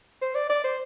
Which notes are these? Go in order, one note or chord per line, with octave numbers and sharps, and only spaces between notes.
C5
D5
D5
C5